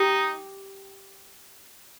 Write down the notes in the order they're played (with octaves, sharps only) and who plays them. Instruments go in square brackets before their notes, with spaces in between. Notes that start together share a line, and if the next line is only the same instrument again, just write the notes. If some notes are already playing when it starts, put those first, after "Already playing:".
Already playing: [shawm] D#4 [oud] G4